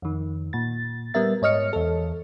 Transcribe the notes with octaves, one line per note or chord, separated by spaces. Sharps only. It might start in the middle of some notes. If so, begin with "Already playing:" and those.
F2 D#3
A#2 A6
G3 B3 A#4 E5 A6
G#2 C#5 D#5 F6 C#7
E2 A4